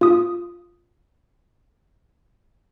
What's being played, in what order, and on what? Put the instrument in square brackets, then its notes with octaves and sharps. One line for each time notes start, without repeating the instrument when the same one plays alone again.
[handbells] F4 D#6